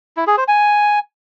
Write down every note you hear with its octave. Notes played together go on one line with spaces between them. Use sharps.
E4
G#4
C5
G#5